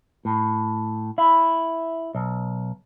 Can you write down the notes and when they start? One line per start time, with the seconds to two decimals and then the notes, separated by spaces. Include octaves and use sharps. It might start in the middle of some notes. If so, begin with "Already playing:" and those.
0.25 A2
1.18 E4
2.15 B1